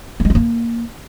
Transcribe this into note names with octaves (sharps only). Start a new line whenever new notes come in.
A#3
G#3
F4
A#3